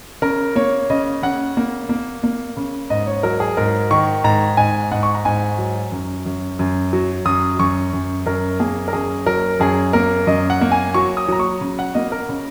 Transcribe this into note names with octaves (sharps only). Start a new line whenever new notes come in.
C#3 A#4
A#3 C#5
C#3 D#5
C#3 F#5
A#3
A#3
A#3
C#3
G#2 D#5
C#5
F#3 A#4
G#4
G#2 A#4
D#3 C#6
G#2 A#5
G#2 G#5
G#2 F#5
C#6
A#5
G#2 G#5
F#3
F#2
F#2
F#2
F#3
F#2 D#6
F#2 C#6
F#2
F#2 A#4
A#3 G#4
A#4
F#2 G#4
F#3 A#4
F#2 G#4
A#3 A#4
F#2 D#5
F#5
A#3
G#5
F#3 C#6
D#6
F#3 A#5
C#6
C#3
F#5
A#3 D#5
A#4
C#3